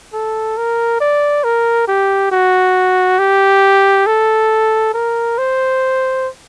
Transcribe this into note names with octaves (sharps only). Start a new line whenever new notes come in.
A4
A#4
D5
A#4
G4
F#4
G4
A4
A#4
C5